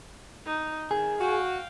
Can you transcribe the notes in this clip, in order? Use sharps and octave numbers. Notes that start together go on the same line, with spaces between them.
D#4
D#3 G#4
F#4 F5 G5